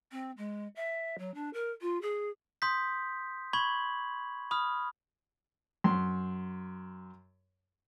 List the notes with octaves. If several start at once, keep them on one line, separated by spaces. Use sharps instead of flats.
C4
G#3
E5
F#3
D4
A#4
F4
G#4
C6 D#6 G6 B6
B5 C#6 G#6 F#7
B5 D#6 F6
F#2 C6